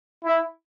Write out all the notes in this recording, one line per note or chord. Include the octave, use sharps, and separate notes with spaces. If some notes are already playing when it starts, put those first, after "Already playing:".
E4